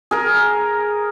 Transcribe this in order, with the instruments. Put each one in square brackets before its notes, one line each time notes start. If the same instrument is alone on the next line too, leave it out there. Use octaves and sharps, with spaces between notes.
[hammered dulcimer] G#4 A#4